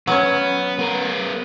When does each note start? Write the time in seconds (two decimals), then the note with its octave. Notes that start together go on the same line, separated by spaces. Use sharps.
0.07 F#3 B3 C#4
0.79 B3 A#4